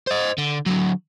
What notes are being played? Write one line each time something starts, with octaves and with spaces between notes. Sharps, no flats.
C5 D#5
D3
D3 F#3